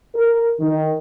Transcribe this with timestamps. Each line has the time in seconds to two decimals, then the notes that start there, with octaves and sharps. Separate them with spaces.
0.15 A#4
0.60 D#3